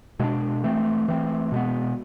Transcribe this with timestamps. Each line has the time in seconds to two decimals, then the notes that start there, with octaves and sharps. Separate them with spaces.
0.20 B2 G#3 B3 D4
0.64 E3 A3 C4
1.08 E3 A3 C4
1.52 B2 G#3 B3